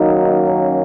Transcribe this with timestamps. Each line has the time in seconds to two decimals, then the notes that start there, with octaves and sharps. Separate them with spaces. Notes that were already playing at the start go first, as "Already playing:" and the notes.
Already playing: F#2 D#3 F#3 A#3 D#4
0.46 C#4